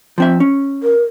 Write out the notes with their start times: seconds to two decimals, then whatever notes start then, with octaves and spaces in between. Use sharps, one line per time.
0.18 F3 C4 E5
0.40 C#4
0.83 A#4